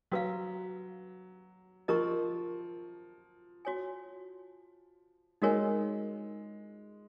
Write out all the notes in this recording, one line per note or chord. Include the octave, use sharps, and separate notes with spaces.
F#3 F#4 B4 F5
F3 A#4 D#5 A#5 C#6
F#4 C#5 G#5
G#3 D#4 F#4 A#4 C#5 G#5